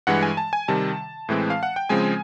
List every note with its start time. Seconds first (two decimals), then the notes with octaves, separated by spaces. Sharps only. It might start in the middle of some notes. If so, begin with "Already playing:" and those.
0.07 G2 E3 G#3 F#5
0.23 G#5
0.37 A5
0.53 G#5
0.68 C3 D#3 G3 A5
1.29 A2 E3 G#3 C4
1.50 F5
1.63 F#5
1.76 G5
1.89 C#3 F3 G#3 C4 G#5